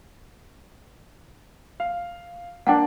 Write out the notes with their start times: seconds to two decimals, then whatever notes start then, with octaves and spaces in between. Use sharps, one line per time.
1.80 F5
2.67 A#3 D4 F#5 G5 A5